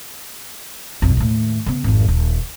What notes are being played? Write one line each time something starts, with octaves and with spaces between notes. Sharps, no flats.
B1 F2
D#2 A2
C#3 B3
G#1 F2
D#1